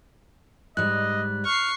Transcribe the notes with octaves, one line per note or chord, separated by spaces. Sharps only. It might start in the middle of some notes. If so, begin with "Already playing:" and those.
G#2 G3 D#5 F#6
C#6 F6 C7